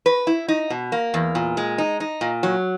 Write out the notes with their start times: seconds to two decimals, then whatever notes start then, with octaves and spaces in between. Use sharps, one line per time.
0.06 B4
0.27 E4
0.48 D#4
0.70 B2
0.92 A#3
1.14 E2
1.35 A#2
1.57 G#3
1.78 D#4
2.00 D#4
2.21 A#2
2.43 F#3